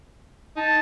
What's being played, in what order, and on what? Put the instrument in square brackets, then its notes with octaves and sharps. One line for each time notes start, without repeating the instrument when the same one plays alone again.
[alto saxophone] D#4 [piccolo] A5